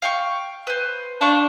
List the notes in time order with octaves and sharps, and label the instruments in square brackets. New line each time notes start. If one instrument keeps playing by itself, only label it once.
[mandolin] F5 G5 C#6
B4 C5
[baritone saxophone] D4 [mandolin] F5 G5 C#6